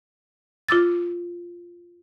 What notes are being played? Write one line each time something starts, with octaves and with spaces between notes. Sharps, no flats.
F4 D6 E6 A6